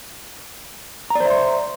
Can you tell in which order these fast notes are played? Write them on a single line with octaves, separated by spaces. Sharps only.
A#5 D5 C5 E5 C6